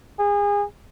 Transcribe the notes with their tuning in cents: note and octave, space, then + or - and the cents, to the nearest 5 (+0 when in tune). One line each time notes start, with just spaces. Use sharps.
G#4 -30